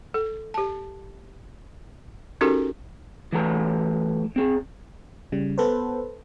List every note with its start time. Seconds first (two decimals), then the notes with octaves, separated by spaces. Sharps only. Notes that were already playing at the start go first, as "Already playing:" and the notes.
0.14 A4
0.54 G4 A5
2.41 C#4 D#4 F#4 G4 A4 A#4
3.32 E3 F#3 A3 A#5
4.36 C4 G#4
5.32 C#3 G3
5.58 B3 A4 B4 C5